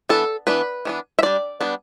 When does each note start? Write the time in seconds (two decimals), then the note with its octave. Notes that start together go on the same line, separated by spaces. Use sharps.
0.09 E3 B3 D4 A4
0.47 E3 B3 D4 B4
0.85 E3 B3 D4
1.19 E5
1.23 G3 D4 D5
1.61 G3 B3 D4